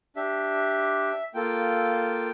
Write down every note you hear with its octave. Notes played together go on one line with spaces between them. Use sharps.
D4 G4 E5
A#3 F4 A4 G5